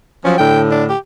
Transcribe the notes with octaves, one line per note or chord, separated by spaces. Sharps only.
F3 F#3 C#4
A2 D3 G5
D4
G4